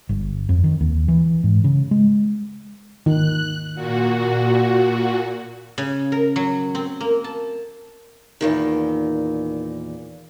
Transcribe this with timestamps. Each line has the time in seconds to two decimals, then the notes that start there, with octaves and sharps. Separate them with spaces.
0.09 G1
0.49 F2
0.64 D#3
0.80 D#2
1.08 E3
1.44 G#2
1.64 C#3
1.91 G#3
3.06 D#3 F#6
3.75 A#2 F#4
5.78 C#3
6.12 A#4
6.36 F#3
6.75 C4
7.01 A#3
7.24 A5
8.41 E2 A#2 D#3